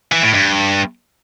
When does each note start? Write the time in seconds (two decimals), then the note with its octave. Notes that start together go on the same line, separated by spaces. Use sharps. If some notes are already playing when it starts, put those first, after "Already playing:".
0.12 E3
0.23 A2
0.34 G2